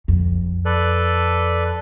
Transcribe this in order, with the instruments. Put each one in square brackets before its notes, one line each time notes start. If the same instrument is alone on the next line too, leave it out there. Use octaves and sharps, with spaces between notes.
[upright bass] F2
[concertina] A4 B4 D5